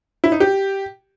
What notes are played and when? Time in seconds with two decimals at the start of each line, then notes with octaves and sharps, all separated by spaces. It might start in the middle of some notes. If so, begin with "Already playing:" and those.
0.24 E4
0.32 D#4
0.40 G4